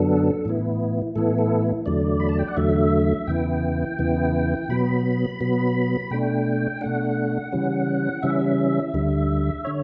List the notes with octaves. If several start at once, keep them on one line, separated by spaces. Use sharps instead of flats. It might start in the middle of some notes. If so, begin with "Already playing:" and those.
Already playing: F#2 D3 F#3 B3 D4 A4
A2 E3 B3 E4
A2 E3 B3 E4 A4
A4
E2 D3 F#3 A3 D5
B5
A5
G5
F#5
E2 D3 F#3 A3 E5
E2 C#3 E3 B3 E4 G5
E2 C#3 E3 B3 E4
B2 F#3 B3 B5
B2 F#3 B3
B2 A3 D4 G5
B2 A3 D4 F#5
C#3 E3 G3 C#4
C#3 E3 G3 C#4 E5
D2 D3 G3
D3 C#5